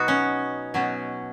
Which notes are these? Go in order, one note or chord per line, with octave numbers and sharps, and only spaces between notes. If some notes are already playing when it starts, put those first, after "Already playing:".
Already playing: B2 F#3 B3 D#4 F#4
C#4
B2 F#3 C#4